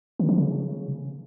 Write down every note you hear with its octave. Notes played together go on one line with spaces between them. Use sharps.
D#3
F3
C#3